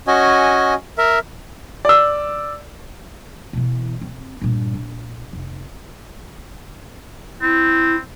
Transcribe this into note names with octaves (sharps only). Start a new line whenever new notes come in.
C#4 F#4 D#5 G#5
A#4 E5
D5 E6
B2 E3
C4
G2 A#2
A#1
F1
C4 E4